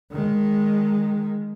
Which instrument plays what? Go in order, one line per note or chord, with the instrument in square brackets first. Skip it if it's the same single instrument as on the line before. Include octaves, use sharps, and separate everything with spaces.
[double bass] D#3 G#3